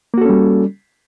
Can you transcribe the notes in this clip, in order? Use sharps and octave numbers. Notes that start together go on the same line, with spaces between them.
G3 A#3 C#4 F#4 A4